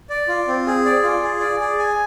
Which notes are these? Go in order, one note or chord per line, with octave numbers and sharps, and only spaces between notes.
D5
F4
C4
G#4
D5
F4
G#4
D5
G#4
G#5